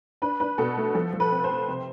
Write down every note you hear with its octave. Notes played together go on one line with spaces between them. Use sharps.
D4 B4
D4 B4
B2 A4
A3
F3 A4
F3
B4
C4
C5
C4
C3